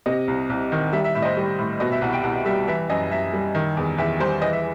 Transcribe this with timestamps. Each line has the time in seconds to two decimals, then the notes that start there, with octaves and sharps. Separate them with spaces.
0.06 C3 D#5
0.28 C2
0.50 C2
0.72 D#3
0.93 G3 E5
1.04 E5
1.15 A2 E5
1.22 D#5
1.25 C5
1.37 G3
1.59 A2
1.80 B2 D#5
1.92 E5
2.02 C2 F#5
2.13 G5
2.23 C2 F#5
2.45 G3 E5
2.68 E3 E5
2.90 F#2 D#5
3.11 F#2 E5
3.33 G3
3.55 D#3
3.77 E2
3.98 E2 E5
4.20 G3 C5
4.41 E3 D#5
4.53 E5